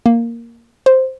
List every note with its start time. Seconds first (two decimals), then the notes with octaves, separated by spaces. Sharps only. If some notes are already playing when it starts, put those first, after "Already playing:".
0.06 A#3
0.86 C5